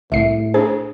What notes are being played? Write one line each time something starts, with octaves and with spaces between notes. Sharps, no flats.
C2 A2 E5 C7
D4 G#4 C5